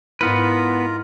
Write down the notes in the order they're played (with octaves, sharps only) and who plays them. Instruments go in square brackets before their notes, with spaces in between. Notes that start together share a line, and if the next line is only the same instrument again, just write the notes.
[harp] G#2 E4 [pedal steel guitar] B3 B4 [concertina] F4 A#4